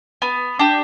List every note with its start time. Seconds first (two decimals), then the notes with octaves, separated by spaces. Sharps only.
0.22 B3
0.59 D4 G4